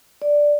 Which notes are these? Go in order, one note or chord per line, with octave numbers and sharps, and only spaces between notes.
D5